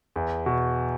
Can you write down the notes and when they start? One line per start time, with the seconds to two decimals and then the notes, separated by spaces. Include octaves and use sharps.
0.16 E2
0.46 B2